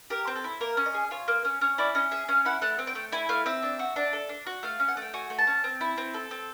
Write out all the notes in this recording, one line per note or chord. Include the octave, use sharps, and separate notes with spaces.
G4 A#4
C4
A4
E4
A#3 A#4
C#4
D#5
G#4
F4 C#5
A#3
C#4
C#4 C#5
E4 D5
C#4 D#5
G#4 E5
C#4 F5
E4 F#5
A3 F#5
C4
G5
A3
E4 G#5
A3 F5
C4 E5
D4
F#4
D4
A4
D4
F#4
A3 F5
C#4
F#5
A3
G5
F#4 G#5
A3
A5
C#4
C4
E4
C4
A4
C4